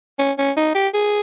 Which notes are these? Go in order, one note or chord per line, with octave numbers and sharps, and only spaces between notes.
C#4
C#4
D#4
G4
G#4